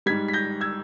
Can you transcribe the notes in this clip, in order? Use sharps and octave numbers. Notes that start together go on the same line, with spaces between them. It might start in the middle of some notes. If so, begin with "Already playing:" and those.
G#2 G3 G#6 B6
B6
G6 A#6
E6 G#6